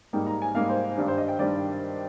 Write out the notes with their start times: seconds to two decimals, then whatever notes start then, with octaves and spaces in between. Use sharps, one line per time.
0.13 G#2 G3 A#3 D#4 G5
0.27 A#5
0.42 G#5
0.55 G#2 G3 A#3 D#4 F5
0.69 C5
0.97 G2 D#3 G3 D4
1.08 C5
1.18 D#5
1.28 G5
1.39 G2 D#3 G3 D4 D5